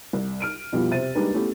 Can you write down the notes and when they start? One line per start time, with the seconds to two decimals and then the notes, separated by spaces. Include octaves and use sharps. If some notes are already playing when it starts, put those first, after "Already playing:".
0.13 C2
0.40 F6 D7 D#7
0.72 F2 B2 G3 B3 E4 F4
0.91 C3 C5 E5 A6 D#7
1.15 G3 G#3 A#3 D4 D#4 B4
1.34 A3 B3 C#4 E4 G4